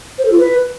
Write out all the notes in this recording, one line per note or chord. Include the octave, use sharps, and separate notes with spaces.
C5
A4
F4
B4